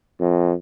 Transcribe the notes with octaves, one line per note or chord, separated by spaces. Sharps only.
F2